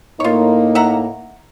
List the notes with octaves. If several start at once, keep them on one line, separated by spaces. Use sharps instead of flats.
A2 A#3 D#4 F4 C#5
E5 F#5 A#5